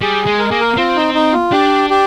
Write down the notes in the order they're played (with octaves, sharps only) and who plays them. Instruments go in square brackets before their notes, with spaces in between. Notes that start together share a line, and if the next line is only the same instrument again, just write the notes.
[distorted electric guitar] G3 [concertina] G#4
[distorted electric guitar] G#3
[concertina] A#4
[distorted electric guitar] A#3 [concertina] G#4
[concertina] A#4
[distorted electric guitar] C4 [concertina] F4
[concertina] D#4
D#4
F4
[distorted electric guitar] D4 [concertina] G4
[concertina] G4